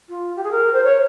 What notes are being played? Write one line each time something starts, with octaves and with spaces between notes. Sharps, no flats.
F4
G4
G#4
A#4
C5
C#5